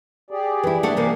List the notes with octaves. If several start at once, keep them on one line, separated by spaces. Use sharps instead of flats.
G4 G#4 D5
E3 E4
A3 D4 F#5
C3 E3 A#3